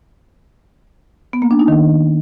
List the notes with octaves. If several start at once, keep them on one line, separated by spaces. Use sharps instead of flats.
B3
A#3
D4
D#4
D#3